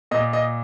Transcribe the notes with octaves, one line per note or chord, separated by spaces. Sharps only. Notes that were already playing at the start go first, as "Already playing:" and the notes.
A#2 D#5
D#5